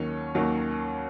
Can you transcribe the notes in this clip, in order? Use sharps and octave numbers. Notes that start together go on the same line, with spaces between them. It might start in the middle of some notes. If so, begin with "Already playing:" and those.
Already playing: D#2 D#3 F#3 C#4
D#2 D#3 F#3